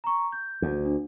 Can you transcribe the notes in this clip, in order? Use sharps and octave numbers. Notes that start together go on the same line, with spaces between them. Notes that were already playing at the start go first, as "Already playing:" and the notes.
A#5 C#6
G6
D2
D4